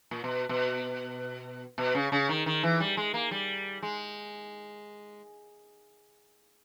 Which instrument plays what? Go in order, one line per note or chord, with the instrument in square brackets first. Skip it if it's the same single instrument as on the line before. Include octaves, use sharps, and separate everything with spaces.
[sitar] A#2
B2
B2
B2
C#3
C#3
D#3
D#3
E3
G3
G#3
A#3
G3
G#3